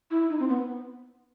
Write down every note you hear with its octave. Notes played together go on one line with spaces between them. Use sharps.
E4
D#4
C4
B3